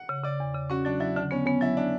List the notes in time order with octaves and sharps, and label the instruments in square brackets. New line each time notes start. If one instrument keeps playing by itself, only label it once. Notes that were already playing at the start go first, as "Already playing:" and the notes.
Already playing: [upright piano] F#5
[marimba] C#3
[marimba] C#3 [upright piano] D5
[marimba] E2
C#3
[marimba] C#4 [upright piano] F#4
[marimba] F#3 [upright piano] D4
[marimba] F#3 [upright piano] E4
[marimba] D3 [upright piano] D4
[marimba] B3 [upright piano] C#4
[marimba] B3 [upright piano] C#4
[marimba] F#3 [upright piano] E4
[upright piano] D4